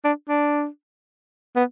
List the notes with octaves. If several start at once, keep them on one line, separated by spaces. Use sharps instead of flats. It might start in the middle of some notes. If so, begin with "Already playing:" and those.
D4
D4
B3